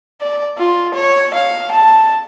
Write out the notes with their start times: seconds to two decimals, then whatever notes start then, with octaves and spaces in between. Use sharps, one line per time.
0.21 D5
0.58 F4
0.94 C#5
1.34 F5
1.72 A5